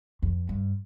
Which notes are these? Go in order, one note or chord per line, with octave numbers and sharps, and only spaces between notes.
F2
G2